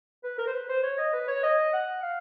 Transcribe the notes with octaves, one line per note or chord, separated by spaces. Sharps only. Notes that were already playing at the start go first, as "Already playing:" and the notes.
B4
A#4
C5
B4
C5
C#5
D#5
B4
C#5
D#5
F#5
F5